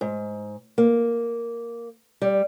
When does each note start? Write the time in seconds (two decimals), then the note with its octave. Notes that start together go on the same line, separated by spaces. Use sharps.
0.01 G#2
0.78 A#3
2.22 G3